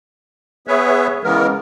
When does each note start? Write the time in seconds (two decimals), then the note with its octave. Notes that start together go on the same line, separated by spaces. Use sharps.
0.67 B3 G#4 B4 C#5 E5
1.24 C#3 E3 G#3 B3 A#4